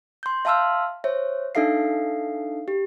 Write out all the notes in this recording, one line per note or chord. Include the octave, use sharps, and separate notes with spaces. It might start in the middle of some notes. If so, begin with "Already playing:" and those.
C6 G6
E5 F5 A5 C6 E6 F6
C5 C#5 E5
D4 D#4 A4 E5 F5 C7
G4